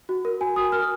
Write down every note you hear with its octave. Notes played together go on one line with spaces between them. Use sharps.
F#4
A#4
F#4 G#5
F#4 D#6
A#4 F6